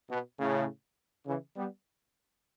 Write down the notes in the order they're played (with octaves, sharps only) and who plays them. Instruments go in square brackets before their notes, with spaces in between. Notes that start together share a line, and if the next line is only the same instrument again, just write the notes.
[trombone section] B2
A2 C#3
C#3 E3
G3 B3